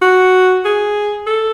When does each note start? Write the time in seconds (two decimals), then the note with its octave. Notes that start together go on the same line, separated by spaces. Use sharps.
0.02 F#4
0.65 G#4
1.27 A4